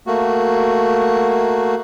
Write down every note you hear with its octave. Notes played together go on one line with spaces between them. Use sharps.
A3 A#3 F#4